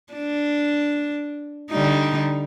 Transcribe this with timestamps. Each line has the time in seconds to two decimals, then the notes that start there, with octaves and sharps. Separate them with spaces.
0.13 D4
1.71 D3 G3 D#4